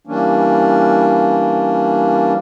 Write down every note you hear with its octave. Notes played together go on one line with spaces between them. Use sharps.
E3 G3 A#3 C#4 D4